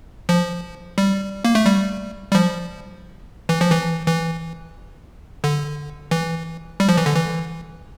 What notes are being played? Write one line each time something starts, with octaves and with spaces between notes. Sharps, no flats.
F3
G3
A#3
A3
G3
G3
F3
E3
F3
E3
E3
D3
E3
G3
F3
E3
D3
E3